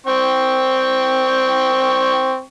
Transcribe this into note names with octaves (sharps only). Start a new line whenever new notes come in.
C4 G5 C#6